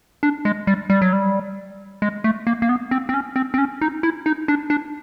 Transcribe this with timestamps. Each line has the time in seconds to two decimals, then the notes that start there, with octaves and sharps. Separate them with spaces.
0.23 D4
0.45 G#3
0.67 G3
0.90 G3
1.02 F#3
1.13 G3
2.02 G#3
2.24 A3
2.47 A#3
2.62 A#3
2.69 B3
2.91 C4
3.09 C4
3.14 C#4
3.36 C4
3.54 C4
3.58 C#4
3.81 D#4
4.03 E4
4.26 D#4
4.48 D4
4.70 D4